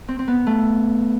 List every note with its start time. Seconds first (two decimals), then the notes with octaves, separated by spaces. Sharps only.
0.08 C4
0.19 C4
0.28 B3
0.46 A3